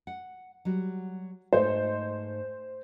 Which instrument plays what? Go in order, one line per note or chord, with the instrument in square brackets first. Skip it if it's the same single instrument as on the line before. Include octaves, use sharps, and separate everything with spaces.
[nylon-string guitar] F#5
F#3 G3 F#4
[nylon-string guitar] G#2 A3 D#4 [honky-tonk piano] C5